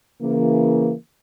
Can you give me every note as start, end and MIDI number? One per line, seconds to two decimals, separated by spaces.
0.22 0.91 49
0.22 0.91 52
0.22 0.91 58